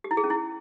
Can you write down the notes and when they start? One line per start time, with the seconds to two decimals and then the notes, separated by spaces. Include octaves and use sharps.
0.04 G4
0.11 E4
0.17 G#4
0.24 C#4
0.30 E4